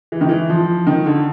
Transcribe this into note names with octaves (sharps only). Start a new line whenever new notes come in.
E3
D#3
E3
F3
D#3
D3